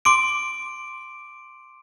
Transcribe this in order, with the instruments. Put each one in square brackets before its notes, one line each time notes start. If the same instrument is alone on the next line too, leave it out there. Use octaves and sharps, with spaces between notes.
[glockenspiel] C6 D6 D7